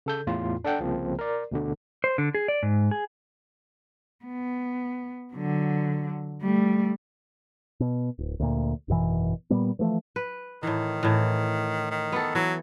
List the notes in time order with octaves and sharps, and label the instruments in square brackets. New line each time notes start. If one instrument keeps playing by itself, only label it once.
[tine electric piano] C#3 A4 G6
E2 A2 F4
D4 A4 F#5 G5
C2 C#3 F3 A#3 C4
A#4 D5
D2 B2 D3
[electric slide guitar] C5
D3
G#4
D5
G#2
G#4
[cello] B3
D3 F#3
G3 A3
[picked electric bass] B2
D1
D2 A#2
G#1 F#2 B2 E3
A#2 G3 B3
E3 F3 A3
[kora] B4
[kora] A2 E3 [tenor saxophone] D#3
[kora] A2 E3
[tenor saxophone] D#3
[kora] B3 A4
[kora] E3 [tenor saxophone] F#3